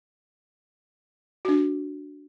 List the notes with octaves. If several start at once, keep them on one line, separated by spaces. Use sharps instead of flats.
D4 F#4